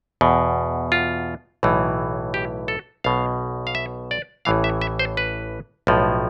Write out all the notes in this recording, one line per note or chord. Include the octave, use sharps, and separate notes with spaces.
E2 B2
F4
B1 A2 E3
G4
A4
B1 B2 F5
F5
E5
D5
A1 A2 E3 F5
E5
E5
C5
B4
B1 A2 F3